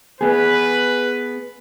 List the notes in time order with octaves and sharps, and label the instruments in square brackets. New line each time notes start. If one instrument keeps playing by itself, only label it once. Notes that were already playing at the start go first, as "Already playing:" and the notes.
[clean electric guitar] B3 G#4 [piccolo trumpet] B4